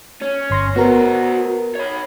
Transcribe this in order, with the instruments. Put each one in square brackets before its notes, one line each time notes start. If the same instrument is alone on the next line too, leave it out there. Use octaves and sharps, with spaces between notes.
[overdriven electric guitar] C#4
[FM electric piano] G1 C6 A#6
[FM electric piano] B3 A#4 [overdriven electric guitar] F#4 C5
[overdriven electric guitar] C#5 B5